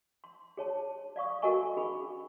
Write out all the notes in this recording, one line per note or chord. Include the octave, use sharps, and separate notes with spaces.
C6
G#4 C#5 A5
D5 F5 C#6 D#6
F#4 A4 A#4 D#5 G#5 C#6
C#4 G#4 B5